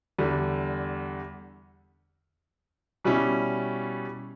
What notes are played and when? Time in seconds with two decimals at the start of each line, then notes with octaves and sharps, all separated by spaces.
0.18 E2 D3 G3
3.04 B2 G3 C#4 E4